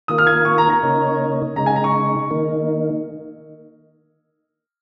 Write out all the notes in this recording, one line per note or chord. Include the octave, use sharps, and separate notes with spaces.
D#3 A#3 F4 A#4 D#6
F6
G#6
C#6
A#5
A#5
C#3 A#3 D#4 C#5
C#3 G#3 D#4 A#5
G#5
A#5
C#6
D#3 A#3 D#4